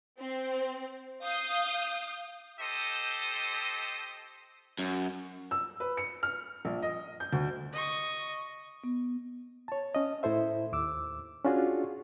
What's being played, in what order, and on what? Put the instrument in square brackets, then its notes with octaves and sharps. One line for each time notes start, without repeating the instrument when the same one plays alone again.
[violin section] C4
F5 D#6 G6
[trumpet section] D#4 G4 A4 C5 D#5
[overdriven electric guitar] F#2
[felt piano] E6
B4
C#7
F6
A#1
D#5
G6
D2
[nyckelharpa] D#5 C#6
[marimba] B3
[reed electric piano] C#5 A5
C#4 D#5
A2 E4 A4 C5 E5
D#2 D6 E6
C#4 D4 F4 F#4 G#4